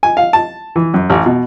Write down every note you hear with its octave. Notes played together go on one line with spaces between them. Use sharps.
G#5
F5
A5
E3
F#2
A1
B2